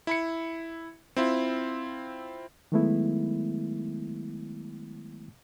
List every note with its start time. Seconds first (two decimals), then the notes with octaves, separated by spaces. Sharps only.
0.07 E4 B5 C#7
1.17 C4 E4 F4
2.72 D#3 F#3 G#3 A3 B3 E4